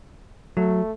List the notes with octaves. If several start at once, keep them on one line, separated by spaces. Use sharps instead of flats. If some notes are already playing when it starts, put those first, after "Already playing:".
F#3 A3